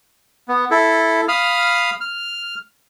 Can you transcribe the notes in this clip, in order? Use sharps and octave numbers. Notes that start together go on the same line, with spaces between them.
B3
E4 A4
F5 B5 D#6 F6
F6